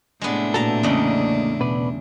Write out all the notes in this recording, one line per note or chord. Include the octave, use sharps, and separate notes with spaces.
A2 C3 G#3 B3 D4
A#2 F#4 A4 A5 A#5
E2 C#3 A#3 D5 D#5
B2 B4 D5